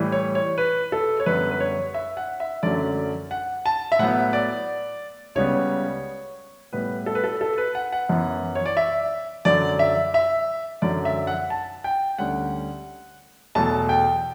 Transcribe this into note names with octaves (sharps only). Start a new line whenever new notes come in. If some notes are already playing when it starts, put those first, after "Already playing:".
Already playing: A2 E3 G3
C#5
C#5
B4
A4
C#5
F#2 D3 G3 B3 B4
B4
C#5
E5
F#5
E5
F#2 D3 F#3 A3 C#4 D5
F#5
A5
E5
A2 F#3 B3 F#5
D5
C#2 C#3 G3 B3 C#5
A2 G3 B3 B4
A4
B4
A4
A4
B4
F#5
F#5
F#2 E3 B3
C#5
D5
E5
F#2 D3 F#3 D5
E5
E5
F#2 D3 F#3 D5
E5
F#5
A5
G5
D2 D3 G3 C#4 F#5
E2 B2 F#3 A3 A5
G5